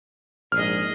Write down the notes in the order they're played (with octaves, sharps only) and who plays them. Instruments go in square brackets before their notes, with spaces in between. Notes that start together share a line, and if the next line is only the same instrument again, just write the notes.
[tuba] A#1 [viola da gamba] G#2 G#4 D#5 [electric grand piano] F6